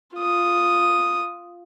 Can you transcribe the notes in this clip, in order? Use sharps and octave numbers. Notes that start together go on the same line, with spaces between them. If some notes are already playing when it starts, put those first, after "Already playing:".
F4 D#6